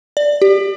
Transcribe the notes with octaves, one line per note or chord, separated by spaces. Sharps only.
D5
G4